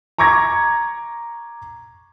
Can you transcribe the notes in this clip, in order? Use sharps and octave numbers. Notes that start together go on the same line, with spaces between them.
A#5 C#6 D6 G#6 A#6